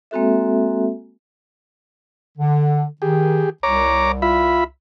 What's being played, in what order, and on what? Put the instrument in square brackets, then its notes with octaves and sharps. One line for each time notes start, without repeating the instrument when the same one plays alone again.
[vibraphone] G#3 A#3 C4 F#4 A4 E5
[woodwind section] D3
[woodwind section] D#3 [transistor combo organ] G4 G#4
[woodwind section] C2 [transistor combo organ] C#5 A#5 D6
[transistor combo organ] F4 E5 B5